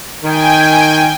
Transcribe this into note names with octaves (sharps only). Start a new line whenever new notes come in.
D#3 G5 G#5